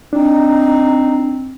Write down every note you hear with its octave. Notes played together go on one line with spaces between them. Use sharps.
C4 D4 D#4